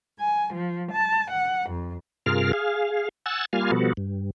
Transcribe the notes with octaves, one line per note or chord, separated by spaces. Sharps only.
G#5
F3
A5
F#5
F2
G2 C3 F4 G#4 A#4 F6
G#4 F5
F#5 G#5 E6 A6
G3 A#3 F4 F5 G#5
B2 F3 G3 B3 F#4 A4
G2